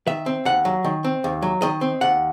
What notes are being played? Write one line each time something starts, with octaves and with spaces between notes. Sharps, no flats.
D#3 E5
C4
D#2 F#5
F#3
D#3
C4
D#2
F#3
D#3 D#5
C4
D#2 F#5